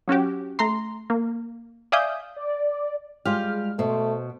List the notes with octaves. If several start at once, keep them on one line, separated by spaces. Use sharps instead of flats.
F#3 C#4 F#4 G4
A3 A#5 C6
A#3
D5 E5 F5 G#5 D#6 G6
D5
G3 G#3 F4 G4 F6
B2 A3 C5